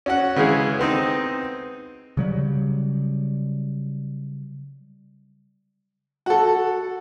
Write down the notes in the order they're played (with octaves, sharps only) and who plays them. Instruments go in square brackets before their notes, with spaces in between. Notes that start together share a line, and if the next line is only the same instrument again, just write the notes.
[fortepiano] C#4 F#4 F#5
C#3 E3 G#3 G#4
B3 C4 D#4
[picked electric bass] C#3 F#3 G3
[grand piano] F#4 A4